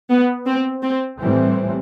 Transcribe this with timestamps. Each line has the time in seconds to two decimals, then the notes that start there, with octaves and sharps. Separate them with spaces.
0.10 B3
0.47 C4
0.83 C4
1.19 A2 E3 G3 C4